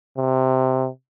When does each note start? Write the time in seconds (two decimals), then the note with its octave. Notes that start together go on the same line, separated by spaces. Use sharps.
0.18 C3